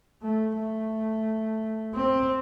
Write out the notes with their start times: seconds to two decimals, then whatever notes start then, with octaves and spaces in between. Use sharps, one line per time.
0.22 A3
0.57 A3
1.95 C4